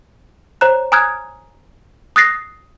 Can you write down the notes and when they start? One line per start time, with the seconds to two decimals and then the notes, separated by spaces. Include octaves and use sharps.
0.61 C5 C#5 A#5 F#6
0.92 G#5 A#5 D#6 F6 F#6 G#6
2.16 D#6 F#6 A6 A#6 C7